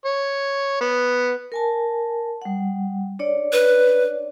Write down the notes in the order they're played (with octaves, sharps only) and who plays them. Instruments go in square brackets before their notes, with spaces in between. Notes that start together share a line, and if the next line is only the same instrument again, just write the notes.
[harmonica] C#5
B3
[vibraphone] A#4 G#5 A5
G3 F#5
D4 C#5 D5
[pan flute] B4